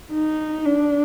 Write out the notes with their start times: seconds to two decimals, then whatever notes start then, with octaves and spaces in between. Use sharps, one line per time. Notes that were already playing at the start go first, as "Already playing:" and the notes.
0.13 D#4
0.65 D4